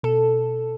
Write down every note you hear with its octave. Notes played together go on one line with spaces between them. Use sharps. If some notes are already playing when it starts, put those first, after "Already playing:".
B2 A4